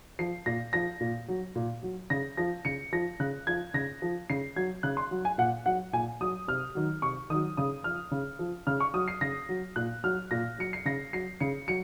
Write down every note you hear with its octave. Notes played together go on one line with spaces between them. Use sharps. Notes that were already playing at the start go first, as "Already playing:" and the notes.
F3 C7
A#2 A#6
F3 A#6
A#2
F#3
A#2
F#3
C#3 A#6
F3 A#6
C#3 C#7
F3 A#6
C#3 F#6
F3 G#6
C#3 A#6
F3
C#3 C7
F#3 G#6
C#3 F#6
C6
F#3
G#5
A#2 F#5
F#3 F#5
A#2 G#5
F#3 D#6
C3 F6
D#3 F#3
C3 C#6
D#3 F#3 D#6
C#3 D#6
F3 F6
C#3
F3
C#3 F6
C#6
F#3 D#6
C7
C#3 A#6
F#3
A#2 F#6
F#3 F6
A#2 A#6
F#3 C#7
C7
C#3 A#6
F#3 C7
C#3 C#7
F#3 C#7